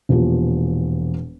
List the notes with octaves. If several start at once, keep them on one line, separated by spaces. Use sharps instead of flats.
E1 E2 A#2 F3 G4